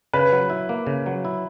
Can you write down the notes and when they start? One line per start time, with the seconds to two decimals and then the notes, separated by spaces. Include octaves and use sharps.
0.13 C#3 B4
0.32 F#3
0.50 E4
0.69 A#3
0.87 C#3
1.06 F#3
1.25 E4